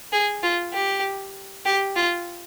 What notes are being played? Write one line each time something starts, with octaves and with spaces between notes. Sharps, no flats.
G#4
F4
G4
G4
F4